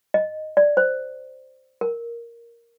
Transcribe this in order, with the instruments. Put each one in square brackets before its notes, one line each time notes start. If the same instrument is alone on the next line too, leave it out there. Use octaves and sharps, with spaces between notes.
[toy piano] D#5
D5
C5
A#4